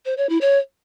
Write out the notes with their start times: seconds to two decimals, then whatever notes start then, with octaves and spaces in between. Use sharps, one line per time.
0.05 C5
0.17 C#5
0.29 E4
0.41 C#5